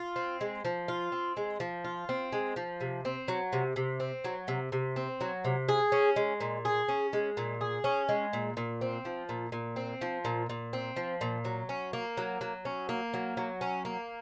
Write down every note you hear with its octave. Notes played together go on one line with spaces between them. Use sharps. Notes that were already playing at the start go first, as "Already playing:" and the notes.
Already playing: F4
C4
G#3
F3
F4
C4
G#3
F3
F4
C4
G#3
F3
C3
C4
F#3
C3
C3
C4
F#3
C3
C3
C4
F#3
C3
G#4
C#4
G#3
A#2
G#4
C#4
G#3
A#2
G#4
C#4
G#3
A#2
A#2
C4
F3
A#2
A#2
C4
F3
A#2
A#2
C4
F3
A#2
F#3
C#4
A#3
F#3
F#3
C#4
A#3
F#3
F#3
C#4
A#3